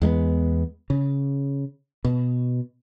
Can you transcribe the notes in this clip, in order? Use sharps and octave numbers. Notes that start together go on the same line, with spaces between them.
E2 G#3 A#3 B3
C#3
B2